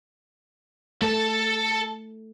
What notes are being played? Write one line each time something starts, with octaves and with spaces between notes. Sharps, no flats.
A3 A4 A5